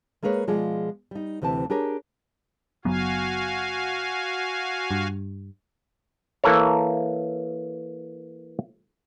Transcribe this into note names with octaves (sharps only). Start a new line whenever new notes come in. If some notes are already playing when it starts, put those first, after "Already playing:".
G#3 A#3 G#4 A#4 B4 C#5
B2 F3 G#3 F4 G#4 D5
G3 D#4
D2 C3 E3 C4 A5
D4 G4 G#4 A#4 C#5
F#1 F#3 B3 F#4 F5 G#5
G2
E3 A#3 A4 A#4 C#5